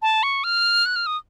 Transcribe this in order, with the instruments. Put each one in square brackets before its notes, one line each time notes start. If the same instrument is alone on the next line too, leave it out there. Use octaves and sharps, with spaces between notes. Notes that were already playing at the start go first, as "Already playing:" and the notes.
[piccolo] A5
C#6
F6
F#6
F6
D#6